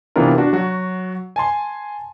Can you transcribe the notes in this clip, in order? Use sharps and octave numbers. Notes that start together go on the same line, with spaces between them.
C3 E3 B3 D4 F4 A#4
D4 F#4
F#3 F#4
G#5 A5 C6